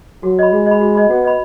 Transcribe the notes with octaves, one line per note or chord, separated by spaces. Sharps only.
F#3 F#4
D#5 B5
G#3 F#4
D#5 B5
F#4
D#5 B5
B3 F#4
D#5 B5